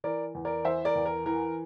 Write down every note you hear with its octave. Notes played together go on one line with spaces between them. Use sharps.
E3 A#4 D5
E2
A#4 D5
E3 C5 E5
A#4 D5
E2
A#4
E3 A#4